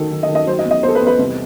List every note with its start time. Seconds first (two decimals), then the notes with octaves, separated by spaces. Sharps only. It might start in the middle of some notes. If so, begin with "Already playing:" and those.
Already playing: D#3 F#3 A4
0.11 D#3
0.23 D#5
0.28 D#3
0.35 D#5
0.47 F#3 C5
0.59 D#5
0.65 E2
0.71 D#5
0.83 E2 C5
0.88 A4
0.95 B4
1.01 E2
1.07 B4
1.19 C2